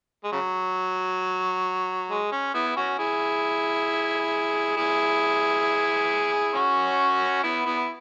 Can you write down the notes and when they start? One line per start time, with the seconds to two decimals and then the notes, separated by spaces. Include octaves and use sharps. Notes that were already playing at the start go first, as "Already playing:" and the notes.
0.24 G#3
0.32 C#3 F#3
2.10 G#3
2.32 C#4
2.54 B3 E4
2.76 C#4 F#4
2.98 E4 G#4
4.76 E4 G#4
6.54 C#4 F#4
7.43 B3 E4
7.65 B3 E4